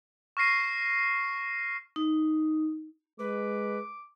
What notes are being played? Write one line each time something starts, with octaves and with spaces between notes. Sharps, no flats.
C#6 F6 A#6 C7 D#7
D#4
G#3 B4 D6